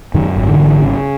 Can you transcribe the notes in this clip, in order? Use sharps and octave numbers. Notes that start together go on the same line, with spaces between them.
F#2 D#3
G#1
D3 E3
G#1
C#3